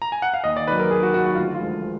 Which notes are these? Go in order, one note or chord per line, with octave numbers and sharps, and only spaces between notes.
A#5
G#5
F#5
F5
D#2 D#5
D5
D#3 F#3 B4
A#4
D#2 G#4
F#4
D#3 F#3 F#4
F#4
D2 F4
F4
D3 F3 G#3